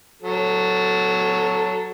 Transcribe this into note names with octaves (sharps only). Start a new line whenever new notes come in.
F#3 A4